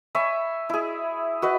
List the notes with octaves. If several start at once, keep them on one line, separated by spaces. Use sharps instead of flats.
C#5 E5 G#5 B5
E4 G#4
F#4 B4 D#5